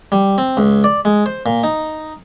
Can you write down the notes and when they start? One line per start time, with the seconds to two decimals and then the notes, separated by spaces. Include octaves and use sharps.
0.12 G3
0.38 C4
0.57 C#2
0.84 D5
1.05 G#3
1.26 C5
1.46 A#2
1.64 D#4